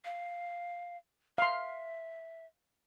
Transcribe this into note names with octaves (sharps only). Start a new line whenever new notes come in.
F5
E5 F5 C6